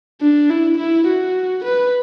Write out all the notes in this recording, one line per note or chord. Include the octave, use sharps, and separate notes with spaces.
D4
E4
E4
F#4
B4